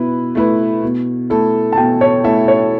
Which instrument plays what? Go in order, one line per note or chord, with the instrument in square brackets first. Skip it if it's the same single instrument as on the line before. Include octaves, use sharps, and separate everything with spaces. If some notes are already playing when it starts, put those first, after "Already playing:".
Already playing: [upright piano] B2 E4 B4
A3 E4 B4
B2
A3 E4 A4
[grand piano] A5
[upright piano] B2 [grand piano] G5
[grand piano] C#5
[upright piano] A3 E4 A4 [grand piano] E5
[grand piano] C#5